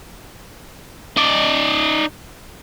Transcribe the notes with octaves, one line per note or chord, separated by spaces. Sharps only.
D#4 D5